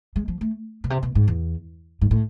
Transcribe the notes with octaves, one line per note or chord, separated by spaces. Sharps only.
G#3
F3
A3
B2
C3
B2
G#2
E2
G#2
A2